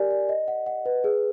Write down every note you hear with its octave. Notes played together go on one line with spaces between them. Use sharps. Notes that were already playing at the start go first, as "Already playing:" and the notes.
Already playing: G4 A#4 D5 G#5
D5
D#5
F#5
F#5
B4
G#4